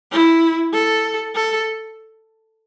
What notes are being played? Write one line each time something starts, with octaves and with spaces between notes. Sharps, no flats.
E4
A4
A4